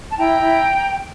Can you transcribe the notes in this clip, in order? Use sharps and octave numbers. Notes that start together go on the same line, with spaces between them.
A5
E4 G5 A#5
E4